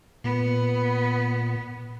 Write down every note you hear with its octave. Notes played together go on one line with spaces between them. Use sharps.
A#2 B3